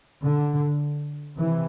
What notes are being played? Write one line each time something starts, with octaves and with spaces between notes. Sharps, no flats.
D3
C3 E3